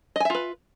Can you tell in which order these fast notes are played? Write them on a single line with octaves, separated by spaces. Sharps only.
D#5 G#5 E5 F4 B4